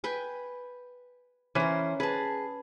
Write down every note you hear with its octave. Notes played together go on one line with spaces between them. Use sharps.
B4 G5 G#5
E3 C#4 A#4 C5
G#4 B4 A5